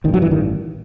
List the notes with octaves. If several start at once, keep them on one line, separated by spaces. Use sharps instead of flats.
A1 G2 D#3
F#3
E3
D#3